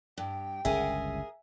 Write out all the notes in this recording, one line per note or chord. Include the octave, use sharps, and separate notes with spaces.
G2 G5
G1 C#2 C#4 G#4 A#4 E5 G#5